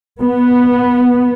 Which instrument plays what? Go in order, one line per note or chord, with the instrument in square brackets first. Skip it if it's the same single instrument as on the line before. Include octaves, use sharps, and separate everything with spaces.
[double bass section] B3